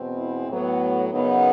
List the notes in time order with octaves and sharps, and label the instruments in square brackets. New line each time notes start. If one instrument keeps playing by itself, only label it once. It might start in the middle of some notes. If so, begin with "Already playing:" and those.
Already playing: [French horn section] E2 B2 G#3 C4
E4
A2 F#3 B3
F#2 C#3 F#3 B3 D#4